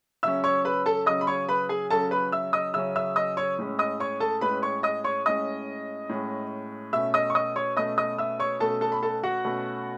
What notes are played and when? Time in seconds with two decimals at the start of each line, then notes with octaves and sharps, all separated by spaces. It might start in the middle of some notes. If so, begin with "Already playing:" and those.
0.23 C#3 F#3 C#4 E5 E6
0.44 C#5 C#6
0.65 B4 B5
0.86 A4 A5
1.06 C#3 F#3 C#4 D#5 D#6
1.21 B5
1.27 C#5 C#6
1.49 B4 B5
1.69 G#4 G#5
1.90 C#3 F#3 C#4 A4 A5
2.11 B4 B5
2.32 E5 E6
2.53 D#5 D#6
2.74 C#3 F#3 C#4 E5 E6
2.96 E5 E6
3.16 D#5 D#6
3.37 C#5 C#6
3.58 A2 G#3 C#4
3.79 D#5 D#6
4.00 C#5 C#6
4.20 A4 A5
4.41 A2 G#3 C#4 B4 B5
4.62 C#5 C#6
4.83 D#5 D#6
5.04 C#5 C#6
5.26 A2 G#3 C#4 D#5 D#6
6.09 A2 G#3 C#4
6.93 B2 A3 C#4 E5 E6
7.14 D#5 D#6
7.30 C#6
7.35 D#5 D#6
7.56 C#5 C#6
7.76 B2 A3 C#4 D#5 D#6
7.98 D#5 D#6
8.18 E5 E6
8.40 C#5 C#6
8.60 B2 A3 C#4 A4 A5
8.81 A4 A5
8.92 B5
9.03 A4 A5
9.23 F#4 F#5
9.45 B2 A3 C#4